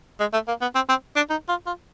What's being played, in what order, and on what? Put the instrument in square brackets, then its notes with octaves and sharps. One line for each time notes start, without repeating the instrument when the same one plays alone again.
[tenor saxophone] G#3
A3
A#3
B3
C4
C4
D4
D#4
F4
F4